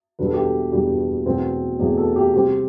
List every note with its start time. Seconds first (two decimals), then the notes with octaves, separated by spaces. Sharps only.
0.19 E2 B2 G3 D4 B4
0.25 A4
0.34 G4
0.42 A4
0.72 E2 B2 G3 D4 G4
1.26 E2 B2 A3 C4
1.79 E2 B2 A3 C4
1.98 A4
2.16 G4
2.34 C3 G3 C4 G4